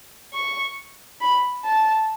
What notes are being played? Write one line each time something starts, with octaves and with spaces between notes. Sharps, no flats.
C#6
B5
A5